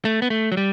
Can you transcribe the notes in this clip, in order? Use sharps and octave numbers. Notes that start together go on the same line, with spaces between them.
A3
B3
A3
F#3
G3